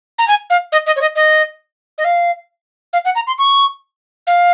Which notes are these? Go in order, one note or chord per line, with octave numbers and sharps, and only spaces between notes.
A#5
G#5
F5
D#5
D#5
C#5
D#5
D#5
D#5
F5
F5
F#5
A#5
C6
C#6
F5